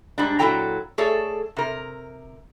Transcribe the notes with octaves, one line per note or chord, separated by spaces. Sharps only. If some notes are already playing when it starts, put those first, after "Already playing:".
G#2 G3 D4
A#2 F#3 E4 A4 G5 A#5
A3 G#4 A4 C#5 D5
C3 A#4